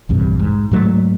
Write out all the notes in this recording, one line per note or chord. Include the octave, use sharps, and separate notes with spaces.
A#1 E2 G2 C3
G#2
G#2 F#3 A3